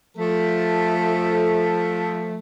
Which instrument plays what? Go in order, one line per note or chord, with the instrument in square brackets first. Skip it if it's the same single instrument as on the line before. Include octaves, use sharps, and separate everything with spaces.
[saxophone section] F3 A3 [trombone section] A4